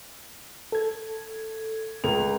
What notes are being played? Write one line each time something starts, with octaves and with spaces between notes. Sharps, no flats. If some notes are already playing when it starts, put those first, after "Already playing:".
A4 G#6
C#2 A#4 F7